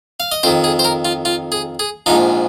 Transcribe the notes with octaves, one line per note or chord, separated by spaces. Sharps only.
F5
D#5
F2 D#3 C5
G#4
C5
A#4
F4
F4
G#4
G#4
A#1 G#2 F3 D#4